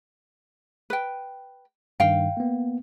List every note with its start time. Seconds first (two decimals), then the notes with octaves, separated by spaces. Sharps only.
0.90 B4 G5
2.00 G2 D#3 F5 G5
2.37 A#3 B3